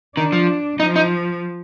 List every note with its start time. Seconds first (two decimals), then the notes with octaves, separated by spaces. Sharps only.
0.17 D#3 D4
0.32 F3
0.80 F3 D#4
0.96 D#4